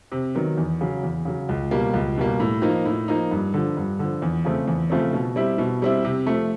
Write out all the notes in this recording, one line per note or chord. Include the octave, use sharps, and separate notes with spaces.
C3
D#3 F#3 B3
E2
C#3 F#3
E2
C#3 F#3
C#2
B2 G3 A#3
C#2
B2 G3 A#3
A2
F3 A#3 D#4
A2
F3 A#3 D#4
G2
D3 F3
G2
D3 F3
E2
C#3 F3 A3 C4
E2
C#3 F3 A3 C4
B2
G3 C4 E4
B2
G3 C4 E4
C3
F3 A3